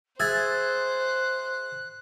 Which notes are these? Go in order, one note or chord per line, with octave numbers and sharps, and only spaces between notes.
G#4 C5 E5 E6 F#6 G#6 A6